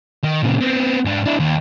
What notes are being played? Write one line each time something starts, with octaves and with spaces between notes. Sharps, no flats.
D#3
A#2 C#3
B3 C4
G#2 D4
D4 E4
D#2